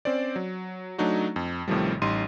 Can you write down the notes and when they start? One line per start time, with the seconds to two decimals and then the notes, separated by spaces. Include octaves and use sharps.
0.05 C4 C#4 C5 D5
0.36 F#3
0.98 F#3 A3 D4 D#4 F#4
1.36 F2
1.68 A1 A2 C3 D#3 F3 G3
2.02 A1 G3 D#4 C6 D#7